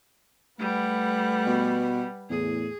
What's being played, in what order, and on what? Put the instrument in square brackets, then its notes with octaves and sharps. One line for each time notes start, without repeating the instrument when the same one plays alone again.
[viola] G3 [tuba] A3 [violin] B4 F#5
[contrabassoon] B2
[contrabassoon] E2 [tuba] A2 [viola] G#4